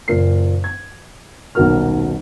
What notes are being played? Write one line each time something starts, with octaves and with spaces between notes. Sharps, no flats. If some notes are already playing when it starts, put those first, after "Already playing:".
F#1 A#2 A#4 C7
G#6
D#1 B1 B2 F#4 A#4 F6